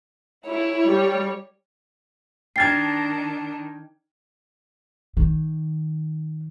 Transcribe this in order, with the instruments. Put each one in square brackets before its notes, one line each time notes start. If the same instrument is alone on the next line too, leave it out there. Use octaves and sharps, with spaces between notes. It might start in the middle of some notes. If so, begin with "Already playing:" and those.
[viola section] E4 [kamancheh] C#5
[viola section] G3
[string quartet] D#3 D4 [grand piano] G5 F6 G#6 [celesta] A6 C7
[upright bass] D#3